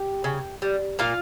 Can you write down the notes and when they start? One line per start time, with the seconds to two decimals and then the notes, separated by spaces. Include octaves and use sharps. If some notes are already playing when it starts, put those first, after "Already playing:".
Already playing: G4
0.24 C#3
0.62 G3
0.99 A#2 F4 F5